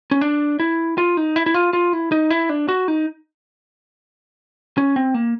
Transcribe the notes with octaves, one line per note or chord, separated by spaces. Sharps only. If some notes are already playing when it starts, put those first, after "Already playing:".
C#4
D4
E4
F4
D#4
E4
E4
F4
F4
E4
D#4
E4
D4
F#4
D#4
C#4
C4
A#3